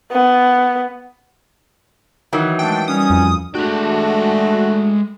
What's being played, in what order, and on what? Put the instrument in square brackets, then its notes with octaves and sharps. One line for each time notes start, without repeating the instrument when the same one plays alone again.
[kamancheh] B3
[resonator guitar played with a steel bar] D#3 E3 F#3
[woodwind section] G#3 A3 D4 [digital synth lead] G5
[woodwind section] G3 C#4 [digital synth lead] D#6
[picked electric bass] F2
[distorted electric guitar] G#3 G5 [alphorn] A3 [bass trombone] D4 [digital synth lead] F#4